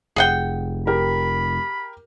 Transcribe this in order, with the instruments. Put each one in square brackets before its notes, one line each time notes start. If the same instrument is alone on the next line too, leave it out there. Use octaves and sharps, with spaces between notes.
[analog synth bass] F1 [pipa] G#4 F#5 G5
[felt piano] G4 A#4 [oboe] B5